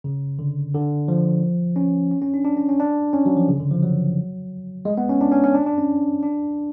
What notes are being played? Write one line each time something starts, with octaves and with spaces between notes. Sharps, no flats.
C#3
D3
D3
F3
C#4
C#4
C#4
D4
D4
C#4
C#4
D4
C#4
F#3
F3
C#3
D3
F3
F#3
G#3
B3
C#4
D4
C#4
C#4
D4
D4
C#4
D4